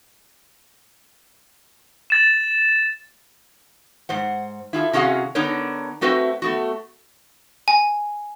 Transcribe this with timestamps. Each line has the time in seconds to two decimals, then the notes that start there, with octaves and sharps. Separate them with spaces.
2.10 A6 E7
4.09 G#2 C5 F#5
4.73 E4 F4 G#4 A4
4.93 C3 C#4 F#4 G#4 F5 F#5
5.35 D3 B3 D4 D#4 A#4 C#5
6.01 A3 C4 F#4 B4 C5 E5
6.42 A3 B3 F#4
7.68 G#5